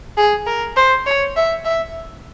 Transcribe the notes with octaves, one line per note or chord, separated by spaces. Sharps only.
G#4
A#4
C5
C#5
E5
E5